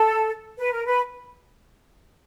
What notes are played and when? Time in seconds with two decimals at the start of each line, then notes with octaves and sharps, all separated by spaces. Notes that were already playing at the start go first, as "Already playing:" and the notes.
Already playing: A4
0.59 B4
0.72 A#4
0.86 B4